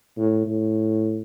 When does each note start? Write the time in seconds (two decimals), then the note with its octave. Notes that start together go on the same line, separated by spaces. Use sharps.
0.17 A2
0.46 A2